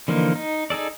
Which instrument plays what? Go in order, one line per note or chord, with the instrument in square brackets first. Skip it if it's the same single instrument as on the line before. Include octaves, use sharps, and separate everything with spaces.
[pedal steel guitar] D3 E3 F3 A#3 D#4
D#4
D#4 G#4 A4 D5